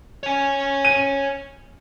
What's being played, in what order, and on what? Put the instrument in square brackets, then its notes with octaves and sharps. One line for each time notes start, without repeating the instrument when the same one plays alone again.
[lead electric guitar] C#5 G#5
[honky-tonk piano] D#7